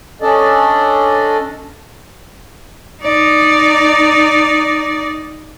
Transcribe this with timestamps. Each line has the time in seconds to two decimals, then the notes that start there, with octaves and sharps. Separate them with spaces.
0.22 C#4 D4 A4 D5 D#5
3.03 D#4 D5